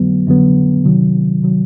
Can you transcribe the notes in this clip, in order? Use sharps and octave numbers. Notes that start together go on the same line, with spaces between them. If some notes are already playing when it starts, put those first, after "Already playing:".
Already playing: F2 D3 F#3 B3
F2 D3 F#3 B3
C3 D#3 F#3
C3 D#3 F#3